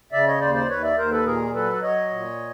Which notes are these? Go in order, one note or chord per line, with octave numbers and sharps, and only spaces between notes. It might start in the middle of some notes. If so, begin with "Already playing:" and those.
C#3 D5 E5
C#5 D#5
D#2 C5 D5
C5 D5
D#2 B4 C#5
D5 E5
D#2 A#4 C5
A4 B4
A#2 G#4 A#4
F#3 A4 B4
F#3 C#5 D#5
A#2